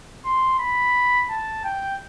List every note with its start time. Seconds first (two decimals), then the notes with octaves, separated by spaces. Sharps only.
0.25 C6
0.59 B5
1.30 A5
1.64 G5